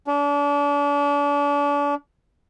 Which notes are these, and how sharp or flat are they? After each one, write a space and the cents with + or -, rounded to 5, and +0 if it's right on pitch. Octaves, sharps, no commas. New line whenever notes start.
D4 -35